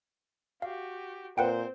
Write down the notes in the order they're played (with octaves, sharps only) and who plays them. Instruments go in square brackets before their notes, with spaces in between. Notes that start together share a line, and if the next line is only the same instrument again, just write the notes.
[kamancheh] F#4 G4 [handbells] F5
[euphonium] A#2 [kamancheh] C4 C5 [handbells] B4 F#5 G5